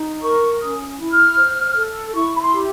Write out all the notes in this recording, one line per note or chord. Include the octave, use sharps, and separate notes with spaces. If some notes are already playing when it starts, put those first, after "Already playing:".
Already playing: D#4
A#4 C#6
C#4 D#6
E4
F6
C5
A4
E4 C#6
B5
C6
G4